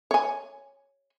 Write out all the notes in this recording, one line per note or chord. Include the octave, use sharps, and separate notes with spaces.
C#5 G#5